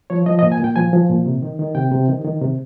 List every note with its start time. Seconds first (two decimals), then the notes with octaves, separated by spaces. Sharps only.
0.10 F3 C#5
0.26 F3 D#5
0.39 D#5
0.43 A#2
0.52 G#5
0.60 A#2 G5
0.76 F3 G#5
0.93 F3
1.10 A#2
1.26 C3
1.42 D#3
1.59 D#3
1.75 C3 G5
1.92 C3
2.09 D#3
2.25 D#3
2.41 C3